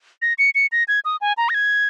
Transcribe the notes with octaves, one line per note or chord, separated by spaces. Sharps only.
A#6
C#7
C#7
A#6
G#6
D#6
G#5
A#5
A#6
G#6